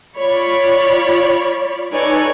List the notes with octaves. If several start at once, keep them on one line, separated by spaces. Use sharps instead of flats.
F4 C#5 D5 B5
D#4 A4 B4 C#5 D5 G#5